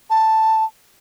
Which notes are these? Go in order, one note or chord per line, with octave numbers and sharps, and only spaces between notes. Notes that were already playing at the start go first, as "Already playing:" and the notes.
A5